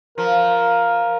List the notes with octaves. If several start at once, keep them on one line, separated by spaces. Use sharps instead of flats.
F3 A#4